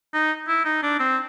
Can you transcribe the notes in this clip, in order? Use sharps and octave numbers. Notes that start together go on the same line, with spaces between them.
D#4
E4
D#4
D4
C4